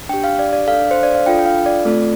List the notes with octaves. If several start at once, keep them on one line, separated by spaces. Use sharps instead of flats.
D4 G4 G5
F5
D5
D5
D4 A4 F5
C5
D5
F5
D4 F4 A4 G5
G5
F5
D5
A3 C4 F4 A4